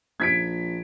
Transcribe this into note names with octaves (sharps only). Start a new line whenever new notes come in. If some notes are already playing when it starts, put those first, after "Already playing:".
A#1 G#6 B6 D7